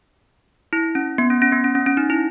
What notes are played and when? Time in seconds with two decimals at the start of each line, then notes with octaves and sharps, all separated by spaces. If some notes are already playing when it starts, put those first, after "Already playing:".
0.73 E4
0.95 C#4
1.18 B3
1.30 C#4
1.42 C#4
1.52 B3
1.64 C#4
1.75 C#4
1.86 C#4
1.97 D#4
2.10 E4